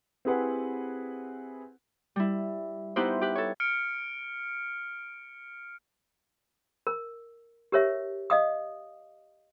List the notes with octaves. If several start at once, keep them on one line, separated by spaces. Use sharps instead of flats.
C4 E4 G4 G#4 B4 F#5
G3 E4
B3 D#4 E4 G4 B4 C5
G4 B4
A4 C#5
F6 C#7 D7
A#4
G4 A#4 C#5 E5
D#5 F5 D#6